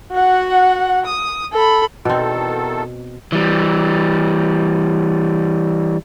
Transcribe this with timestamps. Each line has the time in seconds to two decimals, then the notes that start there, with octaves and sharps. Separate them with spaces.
0.12 F#4 F#5
1.06 D#6
1.52 A4 B5
2.05 E2 B2 D#3 C4 A4
3.32 E3 G3